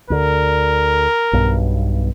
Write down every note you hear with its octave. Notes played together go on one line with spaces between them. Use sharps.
D2 D3 A#4
B1 G2 B2